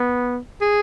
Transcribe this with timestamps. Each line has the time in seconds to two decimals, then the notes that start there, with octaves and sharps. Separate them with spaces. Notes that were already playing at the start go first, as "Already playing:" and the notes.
Already playing: B3
0.61 G#4